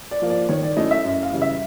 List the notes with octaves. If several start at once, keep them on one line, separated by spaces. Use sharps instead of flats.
D5
F3 A#3
D5
D#3 C#5
D5
F#3 A3 C#4 E4 D#5
E5
F#2
F5
C#3 E3 G3
E5